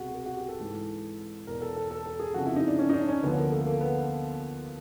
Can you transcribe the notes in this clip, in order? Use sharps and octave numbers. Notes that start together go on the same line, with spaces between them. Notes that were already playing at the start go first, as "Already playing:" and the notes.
Already playing: C2 B2 F#4 G#4
G#4
F#4
G4
A4
G#2 E3
E2 B2 A#4
A4
A4
A4
A4
G#4
F2 C#3 F3 F#4
E4
D#4
D4
C#4
D#4
D4
C#4
D2 D3 F3 B3
A#3
A3
A#3
B3